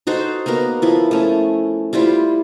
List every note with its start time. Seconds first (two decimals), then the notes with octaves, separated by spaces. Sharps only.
0.07 D#4 F#4 A4 C5
0.46 A#3 B3 F#4 A#4
0.82 F3 E4
1.11 A3 C#4
1.93 G3 E4 F4 C5